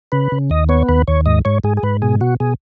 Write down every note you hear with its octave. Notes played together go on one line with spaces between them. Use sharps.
C#3 B4
C#3
D#2 D#5
B3 C#5
D#2 B4
D#2 C#5
G#2 D#5
G#2 C#5
G#2 G#4
G#4
G#2 B4
B2 G#4
B2 F#4
B2 G#4